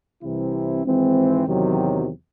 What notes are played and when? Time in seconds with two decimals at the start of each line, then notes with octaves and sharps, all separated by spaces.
0.23 C2 C3 E3 C4 E4
0.85 G#1 G#2 E3 C4
1.47 E2 C3 D#3 F#3